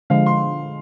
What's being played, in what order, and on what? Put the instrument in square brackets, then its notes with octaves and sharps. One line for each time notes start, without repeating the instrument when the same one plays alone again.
[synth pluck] D3 F3 G#3 [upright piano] F5
[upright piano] C6